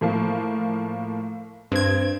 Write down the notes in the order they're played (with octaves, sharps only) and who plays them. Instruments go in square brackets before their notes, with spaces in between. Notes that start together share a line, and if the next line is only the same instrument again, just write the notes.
[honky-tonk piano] A2 F3 A#3
[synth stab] G2 G#6 [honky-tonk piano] C4